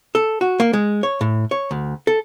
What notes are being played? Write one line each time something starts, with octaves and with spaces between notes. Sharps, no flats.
A4
F#4
A#3
G#3
C#5
A2
C#5
D2
A4